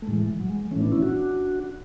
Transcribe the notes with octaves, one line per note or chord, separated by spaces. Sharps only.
A3
A2 E3 G#3
F#3
G#3
A2 E3 A3 C#4
B3 D4
C#4 E4
D4 F#4